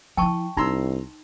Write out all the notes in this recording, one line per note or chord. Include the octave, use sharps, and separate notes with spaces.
F3 E4 G5 A5 C#6
C2 D4 D#4 A#5 C6 E6